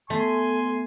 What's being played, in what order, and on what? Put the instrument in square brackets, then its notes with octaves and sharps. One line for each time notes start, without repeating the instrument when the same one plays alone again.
[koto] A3 [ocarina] B3 [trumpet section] G#5 C6